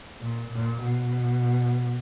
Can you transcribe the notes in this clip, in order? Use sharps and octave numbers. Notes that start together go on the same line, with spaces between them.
A#2
A#2
B2